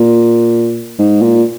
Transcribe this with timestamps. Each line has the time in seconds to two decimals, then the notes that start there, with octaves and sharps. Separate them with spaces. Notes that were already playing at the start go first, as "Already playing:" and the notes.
Already playing: A#2
0.99 G#2
1.22 A#2